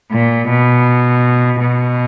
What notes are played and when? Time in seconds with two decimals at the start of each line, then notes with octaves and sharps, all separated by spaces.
0.12 A#2
0.49 B2
1.62 B2